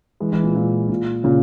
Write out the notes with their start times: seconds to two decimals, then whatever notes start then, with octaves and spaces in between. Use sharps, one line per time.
0.20 E3 G#3
0.32 E3 G#3
0.43 A#2
0.55 A#2
0.89 A#2
1.24 A#2 C#3